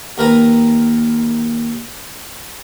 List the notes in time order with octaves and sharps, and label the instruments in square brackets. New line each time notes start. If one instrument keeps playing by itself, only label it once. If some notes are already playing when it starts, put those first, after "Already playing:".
[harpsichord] D#2 A#4 B4 A#5 B5